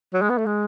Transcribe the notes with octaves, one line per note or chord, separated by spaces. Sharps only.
F#3
G#3
B3
A3
G#3